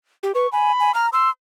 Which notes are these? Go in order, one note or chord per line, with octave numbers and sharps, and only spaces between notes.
G4
B4 C#6
G#5 B5
G#5
A#5 F6
C6 E6